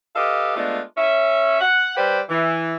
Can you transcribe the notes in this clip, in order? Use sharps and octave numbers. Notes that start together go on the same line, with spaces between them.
G4 A4 B4 D#5 F5
G#3 A3 B3 D4 F4
C#4 E5
F#5
G3 B4 C5 D5 G5
E3